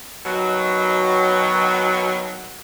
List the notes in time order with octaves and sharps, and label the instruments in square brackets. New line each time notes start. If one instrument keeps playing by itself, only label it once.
[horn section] B2 D#3 F#3